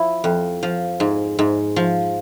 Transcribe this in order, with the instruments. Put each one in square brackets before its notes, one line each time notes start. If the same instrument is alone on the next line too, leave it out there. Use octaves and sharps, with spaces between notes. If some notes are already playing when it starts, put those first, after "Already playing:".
Already playing: [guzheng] F3 E4
F2
F3
G#2
G#2
F3